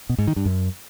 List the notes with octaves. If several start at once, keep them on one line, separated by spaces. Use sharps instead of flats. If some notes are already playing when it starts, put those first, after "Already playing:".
B2
G#2
D#3
G2
F#2